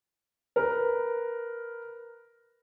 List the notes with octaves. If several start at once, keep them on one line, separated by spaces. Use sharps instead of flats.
A#4 B4